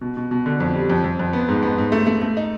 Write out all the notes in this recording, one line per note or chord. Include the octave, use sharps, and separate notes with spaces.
B2
B2
B2
D3
F2
G3
F2
F2
F2
B3
G#2
B3
G#2
A3
A3
A3
D#4